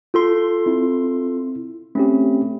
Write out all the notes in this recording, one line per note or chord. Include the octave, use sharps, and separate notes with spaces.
F4 A4 C6
C4 E4
A3 C4 C#4 G4